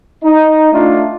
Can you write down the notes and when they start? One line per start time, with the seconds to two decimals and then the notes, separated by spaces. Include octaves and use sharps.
0.24 D#4
0.73 A3 D4 D#4 F4